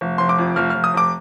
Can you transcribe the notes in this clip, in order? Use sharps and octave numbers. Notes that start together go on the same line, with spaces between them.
F1
F1 C6
D6
F2
F1 F6
F1 F6
D#6
F1 D6